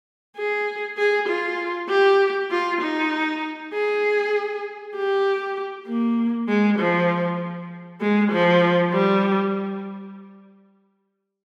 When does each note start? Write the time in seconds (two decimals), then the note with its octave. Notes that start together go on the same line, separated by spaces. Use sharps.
0.37 G#4
0.98 G#4
1.28 F4
1.89 G4
2.51 F4
2.81 D#4
3.73 G#4
4.95 G4
5.87 A#3
6.48 G#3
6.79 F3
8.01 G#3
8.32 F3
8.93 G3